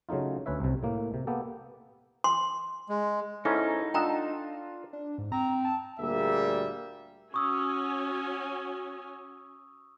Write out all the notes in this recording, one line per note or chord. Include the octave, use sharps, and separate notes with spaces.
C#3 F#3 A3 D#4 F4
D2 C#4 B4 C#5 E5
C2 C3
A2 A#3
C3
A#3 B3 G4 A4
C6
G#3
G#2 C#4 D#4 E4 A4
D4 F4 A4 D#5 F#5 G5 A#5 E7
D4
G#2
C4 A#5
A5
D2 A#2 G3 A#3 G#4 E5
C#4 F#4 G#5 C#6 D#6 E6